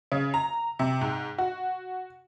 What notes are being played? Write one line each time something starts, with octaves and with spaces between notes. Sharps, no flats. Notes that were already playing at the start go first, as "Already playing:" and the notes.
C#3
A#5
C3
G#2
F#4